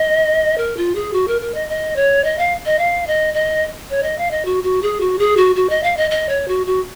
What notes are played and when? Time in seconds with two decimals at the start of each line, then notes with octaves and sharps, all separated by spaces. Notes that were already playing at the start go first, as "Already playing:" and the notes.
Already playing: D#5
0.58 A#4
0.77 F4
0.95 G#4
1.13 F#4
1.28 A#4
1.42 A#4
1.54 D#5
1.69 D#5
1.96 C#5
2.24 D#5
2.39 F5
2.66 D#5
2.79 F5
3.07 D#5
3.34 D#5
3.90 C#5
4.03 D#5
4.18 F5
4.31 D#5
4.45 F#4
4.64 F#4
4.82 G#4
5.01 F#4
5.19 G#4
5.37 F#4
5.56 F#4
5.70 D#5
5.83 F5
5.97 D#5
6.11 D#5
6.29 C#5
6.48 F#4
6.67 F#4